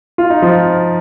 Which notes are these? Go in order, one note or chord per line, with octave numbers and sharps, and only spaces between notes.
F4
D#4
F3 F4